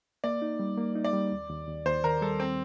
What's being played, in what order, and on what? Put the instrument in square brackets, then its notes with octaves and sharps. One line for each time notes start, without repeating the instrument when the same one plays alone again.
[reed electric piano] A#3 [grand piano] D5
[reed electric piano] D#4
G3
A#3
D#4
[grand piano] D5
[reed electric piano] G3
D#2
D#2
D#2
[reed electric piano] D#2 [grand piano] C5
[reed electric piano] D#3 [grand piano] A#4
[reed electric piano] G3 [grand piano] A4
[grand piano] C4